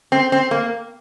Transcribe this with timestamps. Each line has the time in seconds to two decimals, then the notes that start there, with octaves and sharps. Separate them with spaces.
0.12 C4
0.32 C4
0.51 A#3